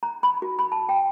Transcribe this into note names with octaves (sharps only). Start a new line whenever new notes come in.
A#5
B5
F#4
B5
A5
G5